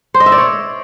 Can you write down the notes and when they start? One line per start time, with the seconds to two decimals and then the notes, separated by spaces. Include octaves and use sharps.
0.14 C5
0.20 D#5
0.26 E5
0.32 D5
0.38 C#5